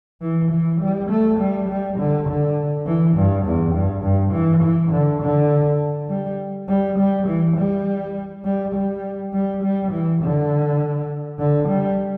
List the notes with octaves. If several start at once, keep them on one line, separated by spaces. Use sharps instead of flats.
E3
E3
G3
A3
G3
G3
D3
D3
E3
G2
E2
G2
G2
E3
E3
D3
D3
G3
G3
G3
E3
G3
G3
G3
G3
G3
E3
D3
D3
G3